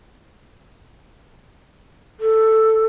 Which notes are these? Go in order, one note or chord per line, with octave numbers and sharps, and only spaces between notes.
A4